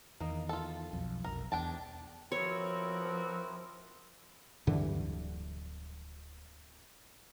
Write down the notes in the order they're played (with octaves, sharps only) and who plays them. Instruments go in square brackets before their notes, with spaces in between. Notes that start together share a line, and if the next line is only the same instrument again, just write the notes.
[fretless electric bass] E2 D#3 [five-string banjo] A#3 D#4
[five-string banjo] F4 A4
[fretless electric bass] B1 F2
[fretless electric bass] F1 B1 [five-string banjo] A#4
[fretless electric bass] E2 [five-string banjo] D4 G5 A5
[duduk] F3 [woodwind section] B3 F#4 A#4 [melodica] C4 E4 [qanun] C#5
[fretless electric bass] D1 G2 D3 E3